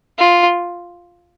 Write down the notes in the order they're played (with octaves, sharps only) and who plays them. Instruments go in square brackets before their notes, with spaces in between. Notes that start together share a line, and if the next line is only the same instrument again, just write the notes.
[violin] F4